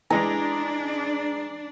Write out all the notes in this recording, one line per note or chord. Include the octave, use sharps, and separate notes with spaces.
E3 G#3 D4 A#5